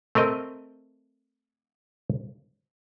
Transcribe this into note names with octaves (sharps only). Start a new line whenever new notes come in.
A3 C4 A#4 D#5